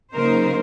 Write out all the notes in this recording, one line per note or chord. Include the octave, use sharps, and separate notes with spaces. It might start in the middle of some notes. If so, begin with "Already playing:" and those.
C#3 F#3 A#3 D#4 A#4 C5